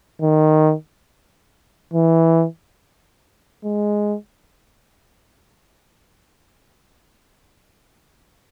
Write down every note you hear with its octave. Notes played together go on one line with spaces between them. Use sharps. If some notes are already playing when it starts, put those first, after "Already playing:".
D#3
E3
G#3